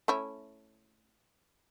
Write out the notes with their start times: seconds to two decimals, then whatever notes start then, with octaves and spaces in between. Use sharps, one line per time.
0.08 A3 C#4 E4